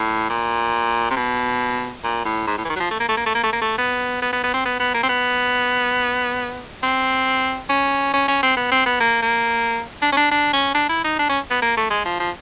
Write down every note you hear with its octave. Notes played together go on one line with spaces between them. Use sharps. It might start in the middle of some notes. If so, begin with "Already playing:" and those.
Already playing: A2
A#2
C3
B2
A#2
A2
G#2
A2
E3
D#3
F#3
F3
A3
A#3
A3
A#3
A3
A#3
A3
A#3
A3
B3
B3
B3
B3
C4
B3
B3
A#3
C4
B3
C4
C#4
C#4
C#4
C4
B3
C4
B3
A#3
A#3
D4
C#4
D4
D4
C#4
D4
E4
D#4
D4
C#4
B3
A#3
A3
G#3
F3
F3